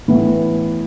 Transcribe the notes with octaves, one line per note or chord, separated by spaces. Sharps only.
A2 E3 B3 E4